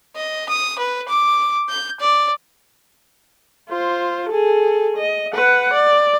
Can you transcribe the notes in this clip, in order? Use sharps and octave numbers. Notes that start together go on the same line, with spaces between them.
D#5
D#6
B4
D6
G6
D5
F4 C5
G#4 A4
D#5
B4 F#5
D5